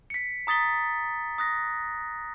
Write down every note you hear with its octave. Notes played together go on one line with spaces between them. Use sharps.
B6 C#7
A#5 D#6 A6 B6 G7
D#6 F#6 A#6